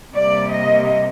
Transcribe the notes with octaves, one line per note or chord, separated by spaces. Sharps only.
C3 G3 A#3 D5
D#5